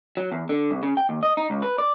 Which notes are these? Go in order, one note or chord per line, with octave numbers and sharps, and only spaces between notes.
F#3
E2
D3
C2
C#3
G5
D#2
D#5
D#4
C#2
B4
D5